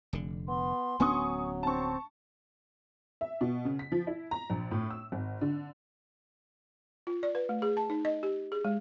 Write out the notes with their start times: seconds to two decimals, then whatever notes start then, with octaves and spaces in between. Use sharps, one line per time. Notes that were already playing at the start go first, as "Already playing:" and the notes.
0.13 F1 D3
0.48 B3 C6
1.00 D1 F#3 B3 C#4 G#5 C#6 D#6
1.63 C4 A5 C#6
3.21 E5
3.41 B2
3.65 C#3
3.79 B6
3.92 F3
4.07 E4
4.31 A#5
4.50 A#1
4.71 A2
4.90 E6
5.12 G#1
5.41 D3
7.07 F4
7.23 D5
7.35 B4
7.49 A3
7.62 G#4
7.77 A5
7.90 D#4
8.05 D#5
8.23 G4
8.52 G#4
8.65 G#3